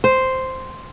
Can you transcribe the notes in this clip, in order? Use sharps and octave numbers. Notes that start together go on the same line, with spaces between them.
C5